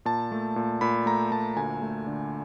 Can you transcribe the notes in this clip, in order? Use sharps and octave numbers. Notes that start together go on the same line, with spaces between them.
A#2 A5
A3
A#2
A#2 B5
A3 A#5
A#2 A5
D2 G#5
A3
D3